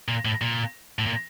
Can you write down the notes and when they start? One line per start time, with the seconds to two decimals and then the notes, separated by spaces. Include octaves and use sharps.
0.08 A#2
0.25 A2
0.41 A#2
0.99 A2
1.06 A#2